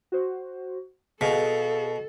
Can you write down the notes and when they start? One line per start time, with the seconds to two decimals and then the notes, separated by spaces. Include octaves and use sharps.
0.12 F#4 C5
1.21 B2 G#4 A4 F5